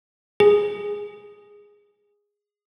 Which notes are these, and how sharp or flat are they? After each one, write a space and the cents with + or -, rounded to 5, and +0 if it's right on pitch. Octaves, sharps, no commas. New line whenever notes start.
G#4 -10